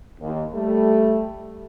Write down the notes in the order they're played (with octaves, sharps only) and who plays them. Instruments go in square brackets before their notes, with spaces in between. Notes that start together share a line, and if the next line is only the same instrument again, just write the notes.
[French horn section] D#2
G3 A3